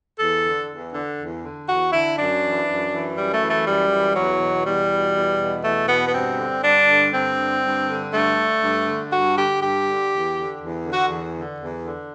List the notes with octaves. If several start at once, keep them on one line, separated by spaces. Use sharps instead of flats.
E2 A4
D3
E2
D3
E2
D3
E2 F#4
D3 E4
F#2 D4
E3
F#2
E3
F#2 G3
A3
E3
A3
F#2 G3
E3
E2 F#3
B2
E2 G3
B2
E2
B2
E2 A3
B2 B3
B3
G2 C4
D3
G2 D4
D3
G2 C4
D3
G2
D3
G2 A3
D3
G2
D3
G2 F#4
D3 G4
G2 G4
D3
E2
D3
E2
D3
F#4
E2
D3
E2
D3